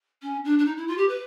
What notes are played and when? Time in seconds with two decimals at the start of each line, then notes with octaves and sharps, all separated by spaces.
0.22 C#4
0.45 D4
0.59 D4
0.66 D#4
0.77 E4
0.88 F4
0.98 G4
1.09 B4